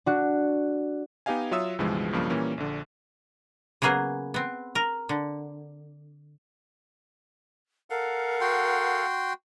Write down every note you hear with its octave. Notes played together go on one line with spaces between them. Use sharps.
D4 F#4
B3 D#4 G4 D#5 F5 G#5
F#3 F4 C#5 E5 D#6 E6
C#2 G2 B2 E3 F3 G#3
B1 G2 C#3 F3 A#3
A#2 E3 G3 A#3 C#4
A#1 D3
C#3 F#3 A#3 B3 G#4
B3 C4
A#4
D3
A4 A#4 F5 F#5
F#4 G5 C6